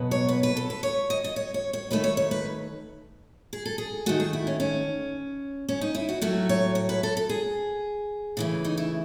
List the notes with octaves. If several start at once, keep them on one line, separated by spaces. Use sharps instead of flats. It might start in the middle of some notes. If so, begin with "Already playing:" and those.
Already playing: B2 F#3 B3
C#5
B4
B4
A4
B4
C#5
D#5
D#5
C#5
C#5
C#5
D#3 A3 B4
C#5
C#5
B4
G#4
A4
G#4
D#3 A3 F#4
G#4
E4
C#4
C#4
C#4
D#4
E4
F#4
A2 F#3 A3 F#4
C#5
C#5
B4
A4
A4
G#4
C#3 E3 A3
D#4
E4